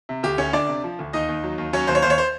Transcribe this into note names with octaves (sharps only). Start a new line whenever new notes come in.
C3
D2 G4
D2 C#4 C#5
D2 D4 D5
C3
F3
D2
D#2 D#4 D#5
D#2
F#3
D#2
F#3 C#4 C#5
D#2 C5
C#5
D#2 C5
C#5
C5